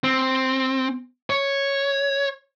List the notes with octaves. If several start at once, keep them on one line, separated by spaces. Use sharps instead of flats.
C4
C#5